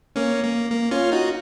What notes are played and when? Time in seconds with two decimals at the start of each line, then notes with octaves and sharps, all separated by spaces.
0.16 A#3 C#4
0.44 A#3
0.71 A#3
0.91 C#4 F4
1.12 D#4 F#4